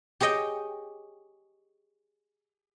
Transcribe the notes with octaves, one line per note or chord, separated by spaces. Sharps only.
G4 G#4 C#5 D#5 G5